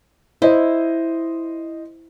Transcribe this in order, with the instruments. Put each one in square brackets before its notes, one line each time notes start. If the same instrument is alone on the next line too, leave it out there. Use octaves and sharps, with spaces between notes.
[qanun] E4 [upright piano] C5 D#5